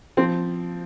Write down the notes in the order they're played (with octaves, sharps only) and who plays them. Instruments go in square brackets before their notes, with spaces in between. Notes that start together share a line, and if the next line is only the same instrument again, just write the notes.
[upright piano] F3 [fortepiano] C4